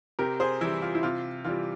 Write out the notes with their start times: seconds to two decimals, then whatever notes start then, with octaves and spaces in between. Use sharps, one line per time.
0.19 C3 G4 A#4
0.40 G#4 C5
0.61 E3 G3 E4
0.82 F4
0.95 E4
1.03 C3 F4
1.45 E3 G3 F4